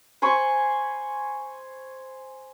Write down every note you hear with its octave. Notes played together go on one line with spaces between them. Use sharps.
C5 G#5 B5 C#6